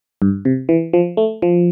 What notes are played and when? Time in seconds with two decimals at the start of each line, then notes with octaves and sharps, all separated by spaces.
0.22 G2
0.45 C3
0.69 E3
0.93 F3
1.17 A3
1.42 F3